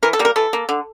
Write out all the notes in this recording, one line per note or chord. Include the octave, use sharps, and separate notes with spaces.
E3 A#4
A4
G3 A#3
A#4
E3 A4
A#3
D3